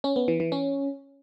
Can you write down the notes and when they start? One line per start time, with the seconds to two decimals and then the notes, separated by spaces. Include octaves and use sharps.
0.04 C#4
0.16 B3
0.28 E3
0.40 E3
0.52 C#4